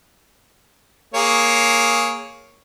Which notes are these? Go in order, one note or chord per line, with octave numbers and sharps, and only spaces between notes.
A#3 G#4 C#5